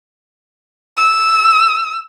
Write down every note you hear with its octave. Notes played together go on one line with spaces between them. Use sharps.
E6